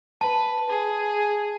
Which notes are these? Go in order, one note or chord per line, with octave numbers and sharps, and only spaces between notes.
B4 A5
G#4